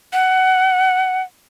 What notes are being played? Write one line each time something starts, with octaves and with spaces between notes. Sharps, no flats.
F#5